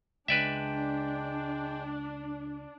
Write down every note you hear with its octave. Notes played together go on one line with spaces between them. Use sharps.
C#2 G#3 D4 B4 D5 E5 G5